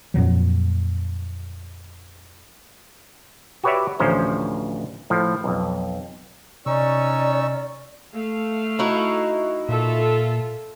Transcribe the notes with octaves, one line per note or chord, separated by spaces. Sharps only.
F2 A#2 F3 F#3
F#4 G4 B4 C#5 D5 E5
A1 D2 F3 C#4 C5 A#5
A2 F3
B1 F2
C3 C#4 D#4 D5 C#6 E6
A3 F5
D#4 E4 F#4
A#2 F4 A4 E5